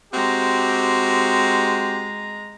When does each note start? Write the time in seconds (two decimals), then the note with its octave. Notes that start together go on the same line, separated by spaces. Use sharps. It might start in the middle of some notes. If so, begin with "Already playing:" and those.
0.13 G#3 C4 F#4 G4 A#5